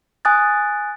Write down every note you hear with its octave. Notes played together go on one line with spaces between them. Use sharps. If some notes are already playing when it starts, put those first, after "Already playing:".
G#5 D#6 F#6 A6